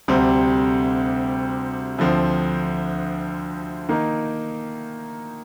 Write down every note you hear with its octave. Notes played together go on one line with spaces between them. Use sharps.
D2 C3 G3 C4
D2 D3 F3 C4
D#3 A#3 D#4